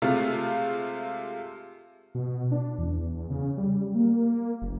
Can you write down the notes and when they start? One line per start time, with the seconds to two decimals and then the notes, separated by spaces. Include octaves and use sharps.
0.02 C3 G#3 A3 F4
2.15 B2
2.52 D4
2.78 E2
3.30 C#3
3.57 G3
3.95 A#3
4.62 F#1